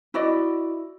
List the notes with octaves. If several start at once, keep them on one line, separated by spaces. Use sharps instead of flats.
E4 F#4 D5 D#5